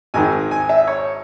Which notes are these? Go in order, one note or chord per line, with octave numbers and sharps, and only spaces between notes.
G#1 G#2 D#3 G#5
G#5
E5
C#5